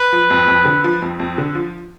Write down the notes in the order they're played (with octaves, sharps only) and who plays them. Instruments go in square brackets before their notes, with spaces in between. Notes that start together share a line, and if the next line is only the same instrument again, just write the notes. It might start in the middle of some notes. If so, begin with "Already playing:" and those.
Already playing: [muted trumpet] B4
[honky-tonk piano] F3
F2
F2
D3
F3
F2
F2
D3
F3